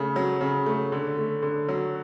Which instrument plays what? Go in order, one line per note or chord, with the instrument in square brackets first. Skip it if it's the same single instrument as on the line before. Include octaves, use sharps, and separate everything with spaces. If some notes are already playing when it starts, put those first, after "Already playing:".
Already playing: [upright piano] C#3 A3
F#3
C#3
A3
D3
A3
D3
F#3